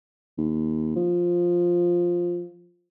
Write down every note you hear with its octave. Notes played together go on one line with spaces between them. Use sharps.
D#2
F3